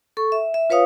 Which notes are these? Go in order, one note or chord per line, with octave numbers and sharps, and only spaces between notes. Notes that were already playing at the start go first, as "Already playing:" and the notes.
A4 C#6
E5
E5
F4 B4 C#5 F5 D#6